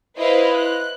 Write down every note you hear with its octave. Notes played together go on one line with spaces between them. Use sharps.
E4 B4 C5 D#5 F5
F#6